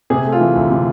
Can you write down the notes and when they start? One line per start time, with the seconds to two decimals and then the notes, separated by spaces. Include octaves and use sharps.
0.10 C3 G#4
0.25 A3
0.32 F4
0.41 E3
0.55 D2
0.70 C3